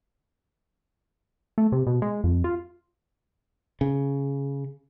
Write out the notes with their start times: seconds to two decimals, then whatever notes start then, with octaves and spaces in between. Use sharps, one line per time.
1.58 A3
1.72 C3
1.87 B2
2.02 G#3
2.24 F2
2.44 F4
3.81 C#3